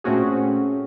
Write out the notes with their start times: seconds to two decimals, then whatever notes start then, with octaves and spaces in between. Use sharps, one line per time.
0.04 A#2 A3 C4 C#4 F#4 G#4